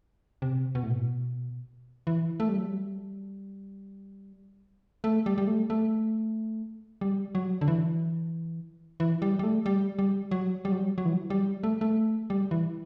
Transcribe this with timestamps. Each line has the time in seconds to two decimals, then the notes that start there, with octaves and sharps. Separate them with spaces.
0.42 C3
0.75 B2
0.83 A2
0.91 B2
2.07 E3
2.40 A3
2.48 G3
2.57 F#3
2.66 G3
5.04 A3
5.26 G3
5.38 G3
5.47 A3
5.70 A3
7.01 G3
7.35 F#3
7.61 D3
7.68 E3
9.00 E3
9.22 G3
9.39 G3
9.44 A3
9.66 G3
9.99 G3
10.31 F#3
10.65 G3
10.72 F#3
10.79 G3
10.98 F#3
11.05 E3
11.14 F#3
11.30 G3
11.63 A3
11.81 A3
12.30 G3
12.51 E3